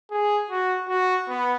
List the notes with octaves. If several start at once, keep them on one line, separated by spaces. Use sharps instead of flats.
G#4
F#4
F#4
B3